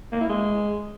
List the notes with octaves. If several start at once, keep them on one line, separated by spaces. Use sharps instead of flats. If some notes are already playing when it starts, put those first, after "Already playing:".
A#3
E4
G#3